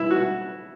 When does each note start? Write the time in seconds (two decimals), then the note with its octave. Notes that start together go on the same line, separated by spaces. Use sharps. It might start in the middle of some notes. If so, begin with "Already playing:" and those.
Already playing: E4
0.11 F#4